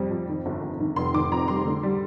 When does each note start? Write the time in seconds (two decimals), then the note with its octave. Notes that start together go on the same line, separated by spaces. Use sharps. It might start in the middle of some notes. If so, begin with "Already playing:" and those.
Already playing: F2 C3 G3
0.11 F2
0.29 D#3
0.46 G1
0.63 G1
0.80 D#3
0.96 F1 C6
1.14 D#3 D6
1.31 F2 A#5
1.48 G3 C6
1.65 D3
1.83 G3